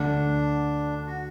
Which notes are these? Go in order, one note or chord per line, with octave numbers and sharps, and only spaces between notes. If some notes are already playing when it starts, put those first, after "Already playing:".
Already playing: D2 D3 A3 D4
F#4